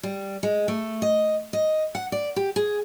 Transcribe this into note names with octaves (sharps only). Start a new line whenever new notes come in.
G3
G#3
A3
D#5
D#5
F#5
D5
G4
G#4